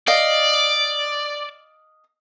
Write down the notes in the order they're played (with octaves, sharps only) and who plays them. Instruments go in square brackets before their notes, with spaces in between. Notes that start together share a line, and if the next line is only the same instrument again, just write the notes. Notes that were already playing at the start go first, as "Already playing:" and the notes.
[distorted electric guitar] D5 [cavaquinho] D#5 F5